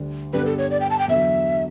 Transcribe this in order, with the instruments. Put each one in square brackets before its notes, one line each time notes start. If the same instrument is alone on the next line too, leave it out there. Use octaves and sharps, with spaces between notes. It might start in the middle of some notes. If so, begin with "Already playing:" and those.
Already playing: [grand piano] D2 D3 G3
[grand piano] G2 D3 G3 B3 [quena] B4
[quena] A4
C#5
D5
G5
A5
G5
[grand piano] E2 D3 F#3 [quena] E5